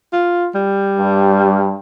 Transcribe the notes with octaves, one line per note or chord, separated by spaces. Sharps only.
F4
G3
G2